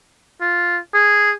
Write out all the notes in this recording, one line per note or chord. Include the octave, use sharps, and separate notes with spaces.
F4
G#4